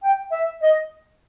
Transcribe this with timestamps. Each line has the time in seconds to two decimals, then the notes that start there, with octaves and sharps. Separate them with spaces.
0.02 G5
0.31 E5
0.61 D#5